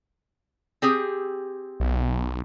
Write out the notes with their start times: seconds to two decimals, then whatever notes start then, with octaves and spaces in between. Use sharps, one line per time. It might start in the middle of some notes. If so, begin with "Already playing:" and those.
0.82 C4 G4 G#4
1.80 B1